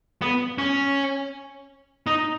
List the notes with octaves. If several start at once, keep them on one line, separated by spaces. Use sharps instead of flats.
B3
C#4
D#4